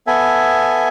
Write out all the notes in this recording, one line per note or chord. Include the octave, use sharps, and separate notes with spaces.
B3 A4 E5 G#5